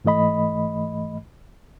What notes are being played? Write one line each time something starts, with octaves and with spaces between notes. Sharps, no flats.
G#2 E3 A3 D#5 B5